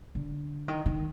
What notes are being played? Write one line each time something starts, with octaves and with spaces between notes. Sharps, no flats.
D3
D#3
D#3